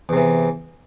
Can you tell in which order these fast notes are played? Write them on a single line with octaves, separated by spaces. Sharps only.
E2 C3 E3